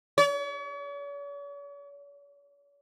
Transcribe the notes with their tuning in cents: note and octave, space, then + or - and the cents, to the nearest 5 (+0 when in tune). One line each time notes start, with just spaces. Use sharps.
C#5 +45